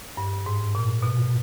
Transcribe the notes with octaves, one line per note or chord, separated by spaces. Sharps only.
G2
G#2
A#2
B2